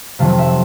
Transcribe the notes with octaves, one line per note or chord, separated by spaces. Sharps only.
F2 C3 D#3 F#3 A3 F5
E5